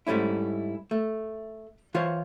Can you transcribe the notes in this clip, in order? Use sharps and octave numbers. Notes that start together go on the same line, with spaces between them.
G#2 G3 A3 C#4 E4
A3
E3 F4 C5 C#5